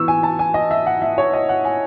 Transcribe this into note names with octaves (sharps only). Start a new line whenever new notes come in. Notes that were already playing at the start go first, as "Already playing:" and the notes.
Already playing: E3 B3 C#6 E6
G#5
A5
G#5
D#5
E5
F#5
E5
C#5
D#5
F#5
G#5